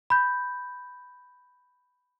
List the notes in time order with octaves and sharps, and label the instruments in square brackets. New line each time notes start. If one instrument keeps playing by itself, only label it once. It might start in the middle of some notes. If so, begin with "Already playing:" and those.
[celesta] B5 G6